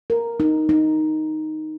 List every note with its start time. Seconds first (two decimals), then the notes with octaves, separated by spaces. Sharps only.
0.10 A#4
0.40 D#4
0.69 D#4